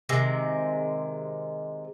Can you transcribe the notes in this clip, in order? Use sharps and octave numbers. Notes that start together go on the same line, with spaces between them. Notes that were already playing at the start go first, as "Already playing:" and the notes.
C3 D#3 G#3